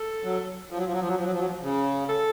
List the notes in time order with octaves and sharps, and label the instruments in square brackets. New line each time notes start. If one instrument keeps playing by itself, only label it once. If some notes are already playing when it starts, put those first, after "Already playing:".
Already playing: [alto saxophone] A4
[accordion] F#3
F3
F#3
F3
F#3
F3
F#3
F3
F#3
F3
F#3
F3
C#3
[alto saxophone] A4